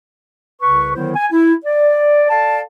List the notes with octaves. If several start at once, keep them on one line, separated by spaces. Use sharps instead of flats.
C2 C#3 B4 C#6
D3 D#3 F#3 B3 E4 C5
G#5
E4
D5
A4 D5 F5 A5